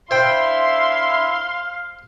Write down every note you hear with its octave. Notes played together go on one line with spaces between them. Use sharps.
D4 E4 C5 E5 F5 G5 C6